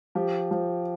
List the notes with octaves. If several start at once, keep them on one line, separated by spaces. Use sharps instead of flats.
F3 G4
F3